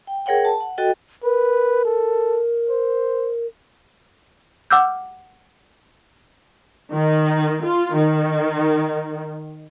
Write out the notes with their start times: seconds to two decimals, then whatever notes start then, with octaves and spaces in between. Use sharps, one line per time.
0.07 G5
0.26 G#4 A#4 C#5 F#5 G5
0.45 A5
0.60 F#5
0.78 F#4 A4 D#5 G5
1.24 A#4 B4
1.85 A4
2.70 C5
4.71 F#5 D6 E6 F6 G6
6.92 D#3
7.65 F4
7.98 D#3